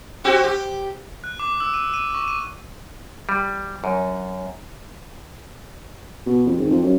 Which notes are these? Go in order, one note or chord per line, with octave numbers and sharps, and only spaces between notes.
C4 F#4 G4
G4
F#6
D6
E6
D#7
D#7
C#6
D#7
G3
F#2
B2
F2
G#1
F2
F#2